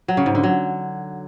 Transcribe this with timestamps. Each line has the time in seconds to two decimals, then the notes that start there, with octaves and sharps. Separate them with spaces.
0.08 F#3
0.17 C#3
0.26 G#2
0.35 D3
0.44 F#3